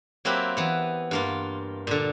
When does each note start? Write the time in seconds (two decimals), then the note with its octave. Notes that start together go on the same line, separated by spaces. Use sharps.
0.25 F#3 A#3 C4 E4 G4 B4
0.57 E3 B3
1.11 G2 A#3 F4
1.87 A#2 D3